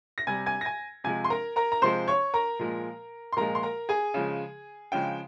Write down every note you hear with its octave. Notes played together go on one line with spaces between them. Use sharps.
A#6
C3 G3 G#5 G#6
G#5 G#6
A#6
G#5 G#6
C3 F3 G#3 G#5 G#6
C6
A#4 A#5
A#4 A#5
A#5
C3 F3 G#3 C5 C6
C#5 C#6
A#4 A#5
A#2 F3 G#3
C6
A#2 F3 G#3 A#4 A#5
C6
A#4 A#5
G#4 G#5
C#3 F3 G#3
C#3 F3 G#3 G5